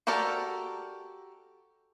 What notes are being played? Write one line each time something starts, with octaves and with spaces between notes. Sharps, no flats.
F#4 G4 A4 A#4 D5